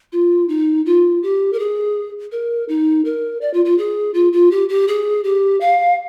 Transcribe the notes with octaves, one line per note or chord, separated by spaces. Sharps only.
F4
D#4
F4
G4
A#4
G#4
A#4
D#4
A#4
D5
F4
F4
G#4
F4
F4
G4
G4
G#4
G4
F5